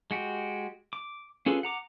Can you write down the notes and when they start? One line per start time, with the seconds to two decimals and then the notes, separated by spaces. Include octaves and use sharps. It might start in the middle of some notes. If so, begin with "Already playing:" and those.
0.11 G#3 F#4 G4
0.93 D6
1.46 C#4 F4 G#4 A4 B4
1.63 F#5 A#5 D6